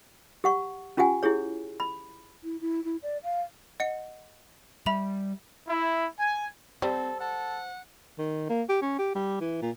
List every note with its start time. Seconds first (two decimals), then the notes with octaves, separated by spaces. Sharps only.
0.44 G4 F#5 C#6
0.97 C#4 F4 G4 F#5 G#5
1.23 E4 G4 G#4 C#5
1.80 B5
2.42 E4
2.61 E4
2.84 E4
3.03 D5
3.24 F5
3.80 D#5 F#5 C#7
4.86 G3 E5 B5 F7
5.68 E4
6.20 G#5
6.82 G3 C4 A4 C5
7.20 A4 F#5
8.18 D#3
8.50 A#3
8.70 G4
8.82 C#4
8.99 G4
9.15 G3
9.41 E3
9.62 A#2